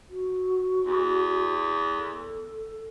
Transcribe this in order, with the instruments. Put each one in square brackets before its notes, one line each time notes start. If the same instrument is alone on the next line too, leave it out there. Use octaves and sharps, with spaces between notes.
[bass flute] F#4
[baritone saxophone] E2
[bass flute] A4